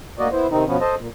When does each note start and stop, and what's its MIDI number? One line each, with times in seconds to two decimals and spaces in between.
0.19 0.28 38
0.19 0.28 58
0.19 0.28 66
0.19 0.28 74
0.19 0.28 75
0.32 0.47 59
0.32 0.47 64
0.32 0.47 72
0.51 0.64 48
0.51 0.64 51
0.51 0.64 60
0.51 0.64 63
0.67 0.77 47
0.67 0.77 53
0.67 0.77 59
0.67 0.77 61
0.80 0.95 69
0.80 0.95 72
0.80 0.95 75
0.98 1.08 46